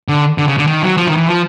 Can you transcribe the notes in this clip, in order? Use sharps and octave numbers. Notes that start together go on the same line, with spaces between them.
D3
D3
C#3
D3
D#3
F#3
F3
D#3
E3
F3